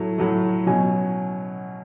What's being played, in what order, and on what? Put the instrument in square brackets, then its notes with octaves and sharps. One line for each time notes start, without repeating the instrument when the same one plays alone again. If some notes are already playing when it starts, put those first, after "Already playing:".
Already playing: [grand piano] A2 F#3 A3
A2 F#3 A3
B2 F#3 C#4 G#5